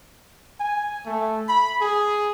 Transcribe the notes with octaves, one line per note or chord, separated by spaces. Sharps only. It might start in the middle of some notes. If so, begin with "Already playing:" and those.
G#5
A3
B5
G#4